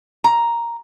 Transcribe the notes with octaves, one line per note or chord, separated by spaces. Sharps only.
A#5